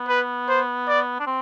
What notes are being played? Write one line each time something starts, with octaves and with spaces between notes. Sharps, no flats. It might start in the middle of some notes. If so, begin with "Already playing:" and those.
Already playing: B3
B4
C5
D5
D4
C4